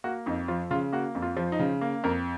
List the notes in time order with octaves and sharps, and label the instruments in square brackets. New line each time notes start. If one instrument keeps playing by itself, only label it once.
[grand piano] A#3 F#4
F2 D#4
F3 F4
C#3 F4
A#3 F#4
F2
F4
F3
D#4
C#3
A#3
F2 A#4